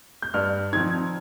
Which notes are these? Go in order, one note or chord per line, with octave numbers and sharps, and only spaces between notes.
G6
G2 F6
F3 C4 D#4 G#6